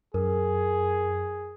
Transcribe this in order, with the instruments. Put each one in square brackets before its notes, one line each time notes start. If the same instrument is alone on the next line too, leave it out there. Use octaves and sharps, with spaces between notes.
[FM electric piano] F#2 [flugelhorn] G#4 [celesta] A#4